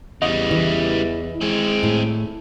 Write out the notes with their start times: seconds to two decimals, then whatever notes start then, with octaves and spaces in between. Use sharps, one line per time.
0.22 E2 C#3 G3 D#5
0.51 E3
1.41 G#3 C4 G#4
1.83 A2